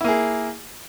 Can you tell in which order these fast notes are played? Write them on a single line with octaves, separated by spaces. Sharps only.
E4 A#3 G#4